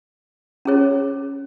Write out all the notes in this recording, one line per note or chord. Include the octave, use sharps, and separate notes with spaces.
C#4 G#4 C#5